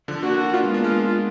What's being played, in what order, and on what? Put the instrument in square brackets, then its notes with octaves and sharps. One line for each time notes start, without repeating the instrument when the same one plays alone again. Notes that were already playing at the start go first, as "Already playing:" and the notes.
[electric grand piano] D3 F3
[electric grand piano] A#3 D4 [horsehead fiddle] F#4
[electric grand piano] A#3 D4 [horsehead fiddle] F4
[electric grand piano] G#3 B3
A#3 D4
[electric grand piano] G#3 B3 [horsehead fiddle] F4